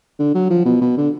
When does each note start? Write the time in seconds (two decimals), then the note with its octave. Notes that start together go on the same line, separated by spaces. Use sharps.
0.19 D3
0.34 F#3
0.50 F3
0.65 B2
0.81 B2
0.97 D3